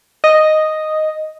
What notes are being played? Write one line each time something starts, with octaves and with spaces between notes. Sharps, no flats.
D#5